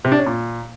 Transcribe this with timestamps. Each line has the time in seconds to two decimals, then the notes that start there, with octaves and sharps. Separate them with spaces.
0.04 C3
0.12 D4
0.19 C#4
0.26 A#2